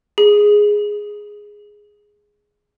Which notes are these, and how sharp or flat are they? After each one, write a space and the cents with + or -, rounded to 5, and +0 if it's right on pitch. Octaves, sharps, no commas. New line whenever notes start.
G#4 +0